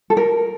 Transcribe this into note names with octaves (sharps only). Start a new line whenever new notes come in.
A4
A#4